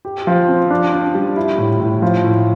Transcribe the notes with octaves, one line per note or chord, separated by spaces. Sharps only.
G4
F3
C4
D4
D4
G3
E4
A2
A2
F3
A2